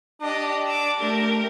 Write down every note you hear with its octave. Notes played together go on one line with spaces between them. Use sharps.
D4 G4 D#5
D6 E6
A3 G4 A#4